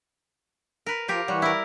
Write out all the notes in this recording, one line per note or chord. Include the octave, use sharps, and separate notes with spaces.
A#4 B4
F3 F4 G4 A#4
E3 G3 C#5 F#5
E4 A#4